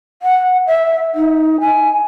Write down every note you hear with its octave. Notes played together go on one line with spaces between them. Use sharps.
F#5
E5
D#4
G#5